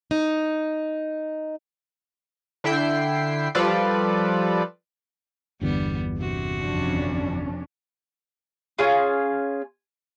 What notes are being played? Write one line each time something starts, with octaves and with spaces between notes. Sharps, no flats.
D#4
D3 E4 E5 G5 C7
F3 G3 F4 A4 B4 D5
G1 E2 D3 G3 B3
C3 F#4
F2 C#4 D4
C#4 F4 G#4